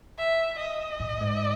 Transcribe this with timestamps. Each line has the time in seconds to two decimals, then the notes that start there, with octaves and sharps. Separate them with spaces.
0.19 E5
0.59 D#5
1.00 A2
1.21 G#2